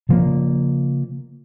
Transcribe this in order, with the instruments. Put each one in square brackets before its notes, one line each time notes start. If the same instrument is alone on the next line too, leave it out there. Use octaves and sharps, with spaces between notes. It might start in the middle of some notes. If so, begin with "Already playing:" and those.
[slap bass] C#3 F3 A#3